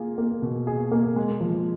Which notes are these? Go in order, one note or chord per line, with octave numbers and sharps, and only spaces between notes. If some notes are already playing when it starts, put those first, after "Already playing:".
Already playing: A#3 F4 G#4
A#3
B2
G#4
A#3
G#3
F3